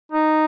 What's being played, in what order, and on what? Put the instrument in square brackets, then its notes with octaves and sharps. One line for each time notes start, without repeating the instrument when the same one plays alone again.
[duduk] D#4